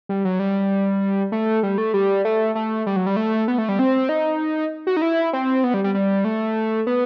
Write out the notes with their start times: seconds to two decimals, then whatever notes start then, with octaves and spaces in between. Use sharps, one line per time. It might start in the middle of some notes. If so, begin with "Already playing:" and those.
0.09 G3
0.25 F#3
0.39 G3
1.32 A3
1.63 G3
1.78 A3
1.94 G3
2.25 A3
2.55 A3
2.86 G3
2.96 F#3
3.07 G3
3.16 A3
3.48 B3
3.58 A3
3.69 G3
3.79 C4
4.09 D#4
4.87 F#4
4.97 D#4
5.02 E4
5.33 C4
5.64 B3
5.74 G3
5.84 G3
5.95 G3
6.25 A3
6.87 B3